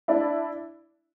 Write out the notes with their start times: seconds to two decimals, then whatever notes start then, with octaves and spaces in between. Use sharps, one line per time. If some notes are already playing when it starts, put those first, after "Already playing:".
0.08 D4 E4